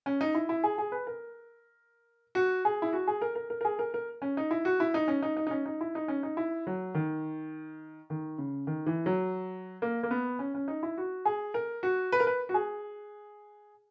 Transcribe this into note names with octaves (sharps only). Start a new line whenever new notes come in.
C#4
D#4
E4
E4
G#4
G#4
B4
A#4
F#4
G#4
E4
F#4
G#4
A#4
A#4
A#4
A#4
G#4
A#4
A#4
C#4
D#4
E4
F#4
E4
D#4
C#4
D#4
D#4
D#4
C#4
D#4
E4
D#4
C#4
D#4
E4
F#3
D#3
D#3
C#3
D#3
E3
F#3
A#3
A#3
B3
C#4
C#4
D#4
E4
F#4
G#4
A#4
F#4
B4
A#4
B4
F#4
G#4